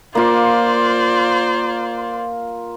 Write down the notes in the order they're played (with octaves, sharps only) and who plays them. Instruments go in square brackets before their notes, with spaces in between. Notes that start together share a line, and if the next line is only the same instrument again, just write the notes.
[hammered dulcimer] A#3 F4 [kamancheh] C5 D5